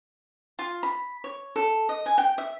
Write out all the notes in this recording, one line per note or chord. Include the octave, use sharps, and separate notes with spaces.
F4
B5
C#5
A4
D#5
G#5
G5
E5